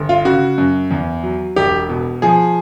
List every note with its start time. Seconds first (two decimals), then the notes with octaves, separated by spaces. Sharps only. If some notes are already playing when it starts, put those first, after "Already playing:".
Already playing: G1
0.09 F4
0.25 C#3 F#4
0.58 F#2
0.91 E2
1.23 F#3
1.56 E1 G4
1.89 B2
2.22 F3 G#4